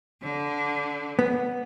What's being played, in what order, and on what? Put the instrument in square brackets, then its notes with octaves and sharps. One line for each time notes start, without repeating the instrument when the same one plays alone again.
[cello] D3
[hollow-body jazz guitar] B3